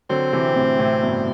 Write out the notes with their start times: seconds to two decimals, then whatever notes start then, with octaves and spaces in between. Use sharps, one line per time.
0.10 D3 F#3 C4
0.33 C3 E3
0.56 A2 C3
0.79 A2 C3
1.02 G2 B2